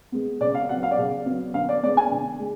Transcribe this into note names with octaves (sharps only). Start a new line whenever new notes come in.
G#3 B3
C#3 D5
F5
F#3 B3 F#5
F5
D5
C#3 F5
F#3 B3
D3 F5
D5
G#3 B3 D5
G#5
D3
G#3